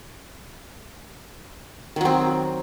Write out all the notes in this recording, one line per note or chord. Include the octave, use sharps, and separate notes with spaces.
D#3 F#3 C4